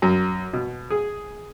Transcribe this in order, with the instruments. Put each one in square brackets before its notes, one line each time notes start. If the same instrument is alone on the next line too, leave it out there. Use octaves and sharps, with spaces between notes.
[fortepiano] F#2
B2
G#4